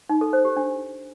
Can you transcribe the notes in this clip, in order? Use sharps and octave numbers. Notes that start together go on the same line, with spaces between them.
D#4
A4
C5
G4
D4